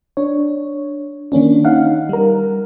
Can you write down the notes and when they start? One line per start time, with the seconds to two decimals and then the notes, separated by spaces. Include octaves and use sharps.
0.17 D4 C#5
1.32 D#3 A#3 C#4 D4
1.65 D#4 F5 F#5
2.09 G3 A#4